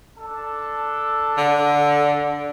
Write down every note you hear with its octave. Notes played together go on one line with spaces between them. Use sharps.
D4 A4
D3